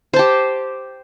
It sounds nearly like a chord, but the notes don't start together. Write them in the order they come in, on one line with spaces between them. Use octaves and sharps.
C5 A5 G4